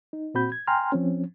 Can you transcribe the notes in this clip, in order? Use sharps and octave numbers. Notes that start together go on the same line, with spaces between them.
D#4
A#2 C4 F#4 B5 G6
G#6
G5 G#5 A#5 C6 F6
F3 C4 C#4